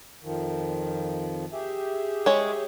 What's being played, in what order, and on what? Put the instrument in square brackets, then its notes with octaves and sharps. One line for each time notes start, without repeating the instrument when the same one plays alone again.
[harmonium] F2 D#3 F3
G4 G#4 E5
[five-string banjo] G#3 C#5